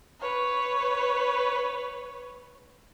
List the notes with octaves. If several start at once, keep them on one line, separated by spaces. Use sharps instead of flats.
B4 C#5